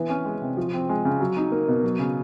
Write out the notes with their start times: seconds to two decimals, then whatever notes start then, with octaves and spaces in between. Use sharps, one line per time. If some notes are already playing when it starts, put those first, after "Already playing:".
Already playing: E3 B3
0.09 C#4
0.25 G#3
0.42 C3
0.57 F3
0.73 C4
0.89 G#3
1.05 C#3
1.20 F#3
1.37 D#4
1.52 A#3
1.68 B2
1.84 F#3
1.99 C#3